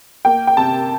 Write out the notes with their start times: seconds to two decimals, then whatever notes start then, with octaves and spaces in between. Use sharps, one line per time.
0.25 A#3 G5
0.47 G5
0.57 C3 A5